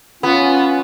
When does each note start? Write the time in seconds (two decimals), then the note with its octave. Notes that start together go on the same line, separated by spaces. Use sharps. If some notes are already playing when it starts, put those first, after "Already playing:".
0.23 B3 C#4 F4